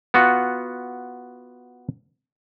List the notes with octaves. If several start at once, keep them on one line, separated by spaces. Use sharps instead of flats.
B3 F4 F#4